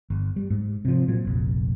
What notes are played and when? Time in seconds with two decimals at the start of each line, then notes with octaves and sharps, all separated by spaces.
0.10 G1
0.36 G3
0.50 G#2
0.85 C3 F3
1.08 A#2 F#3
1.24 F1 A#1